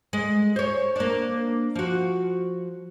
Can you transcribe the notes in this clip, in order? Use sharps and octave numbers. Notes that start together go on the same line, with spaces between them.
G#3
C5 C#5
A#3 D4
F3 F#4